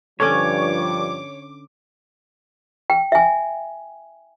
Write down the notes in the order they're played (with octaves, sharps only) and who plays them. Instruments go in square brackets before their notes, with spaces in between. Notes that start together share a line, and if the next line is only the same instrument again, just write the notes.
[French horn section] G2 F3 [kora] D3 C#4 D5 [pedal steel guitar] C#5 [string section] D6
[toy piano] G5
E5 G#5